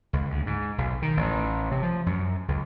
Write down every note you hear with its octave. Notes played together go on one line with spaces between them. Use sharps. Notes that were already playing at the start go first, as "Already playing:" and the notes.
C#2
D2
G#2
B1
D#3
A1
C3
F3
F#2
C#2